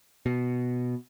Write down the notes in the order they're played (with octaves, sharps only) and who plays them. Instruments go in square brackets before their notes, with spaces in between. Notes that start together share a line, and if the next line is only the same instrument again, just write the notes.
[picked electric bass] B2